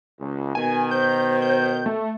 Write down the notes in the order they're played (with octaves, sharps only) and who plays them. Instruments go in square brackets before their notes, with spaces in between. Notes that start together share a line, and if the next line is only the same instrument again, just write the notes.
[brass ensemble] C#2
[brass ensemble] B2 D#3 [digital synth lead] G#5
[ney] C5 [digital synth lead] G6
[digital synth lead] G6
A3